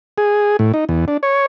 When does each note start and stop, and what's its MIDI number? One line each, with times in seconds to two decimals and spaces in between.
0.18 0.57 68
0.59 0.72 45
0.74 0.85 63
0.89 1.05 40
1.08 1.17 62
1.23 1.46 73